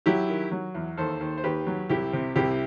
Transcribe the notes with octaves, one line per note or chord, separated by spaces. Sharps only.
F#3 E4 G4
D#3
F#3
E2
D#2 A4 C5
D#2
C5
D#2 G4 B4
F#3
C2 E4 G4
C3
C2 E4 G4